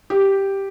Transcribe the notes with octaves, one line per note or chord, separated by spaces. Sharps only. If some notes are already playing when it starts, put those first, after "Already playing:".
G4